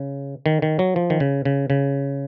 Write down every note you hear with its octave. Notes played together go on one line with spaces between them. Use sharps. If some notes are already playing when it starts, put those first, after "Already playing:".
Already playing: C#3
D#3
D#3
F#3
F3
D#3
C#3
C#3
C#3